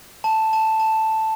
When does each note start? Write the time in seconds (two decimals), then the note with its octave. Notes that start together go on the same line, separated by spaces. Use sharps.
0.24 A5
0.53 A5
0.80 A5